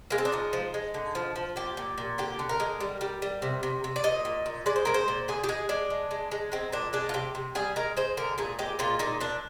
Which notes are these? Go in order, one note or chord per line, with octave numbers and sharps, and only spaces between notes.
G#3 A#3
C4
D4
F3 D#4
F3
G#3
D3
F3
F3
A#2 G4
A#2
A#2
D3 G4
D3
A#4
G#3
G3
G3
G3
C3
C3
C3
D5
A#2 D#5
A#2
A#2
G#3 D5
C5
G#3 A#4
C5
A#2
D3 G#4
G4
G#3 G#4
G#3 D4
G#3
G#3
G#3
G#3 C4
A#2 D4
G#3 D4
F4
C3 G4
C3
G3 G#4
G#3 A#4
G#3 C5
D3 A#4
A#2 G#4
G#3 G4
A#2 F4
A#2 D#4
A#2 D4